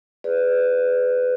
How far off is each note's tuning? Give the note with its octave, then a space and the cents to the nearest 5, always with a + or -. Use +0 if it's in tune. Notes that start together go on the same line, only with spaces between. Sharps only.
G#4 +0 B4 +20 D5 +0